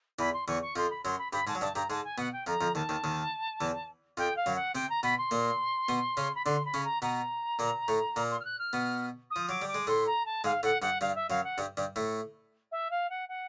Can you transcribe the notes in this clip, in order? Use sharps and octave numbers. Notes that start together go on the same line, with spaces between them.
E2 E3 B5
C6
E2 E3 C#6
C#6
F2 F3 C6
B5
F#2 F#3 C6
B5
G2 G3 B5
G#2 G#3 A5
F#3
G2 G3 A5
G2 G3 A#5
G#2 G#3 A5
G#5
B2 B3 F#5
G5
F2 F3 A#5
F2 F3
D#2 D#3 A5
D#2 D#3
D#2 D#3
E2 E3
F2 F3 G5
F5
F#2 F#3
F#5
C3 C4 G5
A#5
B2 B3 B5
C6
A#2 A#3
B2 B3
C#3 C#4
B5
D3 D4 C6
B5
C#3 C#4
A#5
B2 B3 A#5
A#2 A#3
A2 A3
A#2 A#3
C6
F6
F#6
F6
B2 B3
D#6
F3
F#3 D6
G3
D6
G#3
A2 A3 C6
A#5
A5
G#2 G#3 F5
A2 A3 F#5
G2 G3 F#5
G2 G3 F5
E5
F#2 F#3 F5
F#5
G2 G3
G2 G3
A2 A3
E5
F5
F#5
F#5